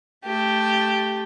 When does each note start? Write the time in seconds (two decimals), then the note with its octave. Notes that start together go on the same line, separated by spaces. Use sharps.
0.25 A3 G4